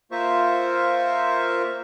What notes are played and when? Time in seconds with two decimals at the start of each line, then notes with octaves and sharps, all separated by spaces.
0.11 A#3 F4 A#4 C5 E5 C#6